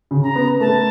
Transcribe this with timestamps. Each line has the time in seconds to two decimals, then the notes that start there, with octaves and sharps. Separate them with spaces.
0.11 C#3
0.23 A#5
0.35 B3
0.60 A3 A5